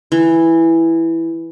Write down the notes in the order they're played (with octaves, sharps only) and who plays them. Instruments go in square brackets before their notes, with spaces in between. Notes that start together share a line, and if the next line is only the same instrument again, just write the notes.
[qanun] E3